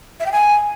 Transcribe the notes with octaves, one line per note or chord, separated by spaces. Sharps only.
E5
G5
G#5